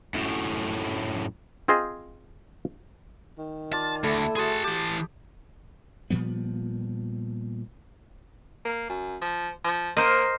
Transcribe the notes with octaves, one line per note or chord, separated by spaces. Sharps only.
F#2 A2
C4 F4 G#4 C5 D#5
D#3
F4 D5 A5
D2 A3 E4 A4
F#4 G#4 A5 C6 D#6
E3 G4 A5
A#2 F3 G3 B3
A#3
F#2
F3
F3
A#3 A#4 C5 D#5